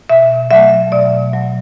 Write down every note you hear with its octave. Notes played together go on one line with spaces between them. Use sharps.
B2 E5
F#3 A3 E5
B2 D5
F#3 A3